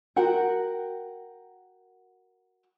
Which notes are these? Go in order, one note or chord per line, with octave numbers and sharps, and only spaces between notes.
F#4 A#4 F#5 G5